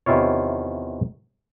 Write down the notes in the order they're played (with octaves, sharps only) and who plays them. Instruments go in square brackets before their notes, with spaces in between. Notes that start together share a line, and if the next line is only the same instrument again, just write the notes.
[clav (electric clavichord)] E2 C3 D#3 E4 F4 C#5